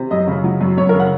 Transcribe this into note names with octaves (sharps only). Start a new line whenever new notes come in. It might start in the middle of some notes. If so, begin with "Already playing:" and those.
Already playing: C3
F#2 D#5
C#3
F#3
F#2
F#2 C#5
A#4
C#3
F#5